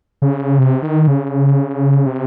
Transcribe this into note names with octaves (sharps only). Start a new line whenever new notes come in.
C#3
C3
D#3
C#3
C3